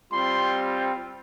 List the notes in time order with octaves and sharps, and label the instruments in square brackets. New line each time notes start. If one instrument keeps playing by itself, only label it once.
[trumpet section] G3 C4 F4 C6